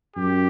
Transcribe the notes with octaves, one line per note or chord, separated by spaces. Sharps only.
F#2 G4